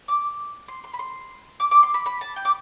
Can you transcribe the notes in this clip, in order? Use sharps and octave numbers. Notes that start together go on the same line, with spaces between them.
D6
C6
C6
B5
C6
D6
D6
C6
B5
B5
A5
G5
D6